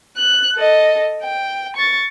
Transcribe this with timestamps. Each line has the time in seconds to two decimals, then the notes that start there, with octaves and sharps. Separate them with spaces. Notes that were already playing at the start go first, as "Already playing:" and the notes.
0.17 F#6
0.55 A4 D#5
1.23 G5
1.76 C#6 A6